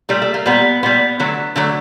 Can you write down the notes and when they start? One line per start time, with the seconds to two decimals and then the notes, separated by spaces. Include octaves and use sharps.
0.09 A#2 G3 A3
0.22 A3
0.34 A#3
0.46 A#2 G3 B3
0.83 A#2 G3 B3
1.20 D3 F#3 A3
1.56 D3 F#3 A3